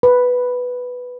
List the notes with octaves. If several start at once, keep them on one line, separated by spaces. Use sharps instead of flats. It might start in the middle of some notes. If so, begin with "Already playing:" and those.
B4